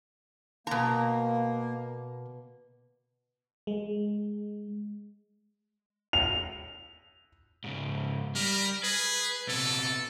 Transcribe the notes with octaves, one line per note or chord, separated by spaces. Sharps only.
B2 A#3 A#5
G#3
F7
G#2 C#3
G3 A#4
G#4 B4
C3 B3 A4